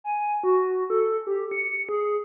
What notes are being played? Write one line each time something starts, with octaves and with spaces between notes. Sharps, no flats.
G#5
F#4
A4
G4
C#7
G#4